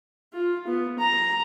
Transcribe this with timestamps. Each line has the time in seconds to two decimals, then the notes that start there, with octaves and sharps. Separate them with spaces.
0.33 F4
0.67 B3
0.99 A#5